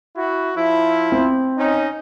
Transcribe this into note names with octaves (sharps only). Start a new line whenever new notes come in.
E4 F#4
F3 E4
C4
C#4 D#4